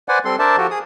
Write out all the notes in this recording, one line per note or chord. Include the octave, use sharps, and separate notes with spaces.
B4 C5 D5 F#5 G#5
G3 C4 A4 C6
D4 A#4 C5 D5 E5 A5
F3 F#4 G4 A4
G#4 D#6